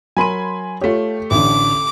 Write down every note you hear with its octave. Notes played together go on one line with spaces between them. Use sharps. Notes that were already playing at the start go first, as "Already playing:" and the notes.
F#3 A#4 G#5 B5 C6 D#7
A3 F4 G4 C#5
A1 D3 D6